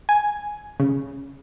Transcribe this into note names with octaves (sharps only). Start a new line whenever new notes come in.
G#5
C#3